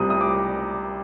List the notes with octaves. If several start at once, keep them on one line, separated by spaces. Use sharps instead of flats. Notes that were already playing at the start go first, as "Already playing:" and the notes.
Already playing: C2 C3 G3 D#6
D#6
D6